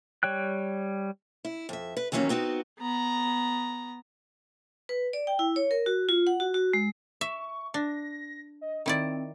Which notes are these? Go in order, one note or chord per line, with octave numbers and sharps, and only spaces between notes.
G3 C#5 G5 F#6
E4
F2 E5
B4
D#2 E3 F#3 A#3 C#4 D#4
B3 C4 D#4 F#4
B3 A#5
B4
D5
G5
E4
C#5
A#4
F#4
F4
F#5
F#4
F#4
G#3
E5 C#6
D4 A#6
D#5
D#3 C4 E4 D5